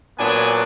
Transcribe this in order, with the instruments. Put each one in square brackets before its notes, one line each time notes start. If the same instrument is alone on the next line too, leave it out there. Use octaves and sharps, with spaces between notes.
[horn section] A#2 F#3 B3 D4 G#5